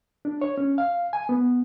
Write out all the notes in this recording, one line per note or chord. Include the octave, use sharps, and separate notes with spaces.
D4
C#5
C#4
F5
G#5
B3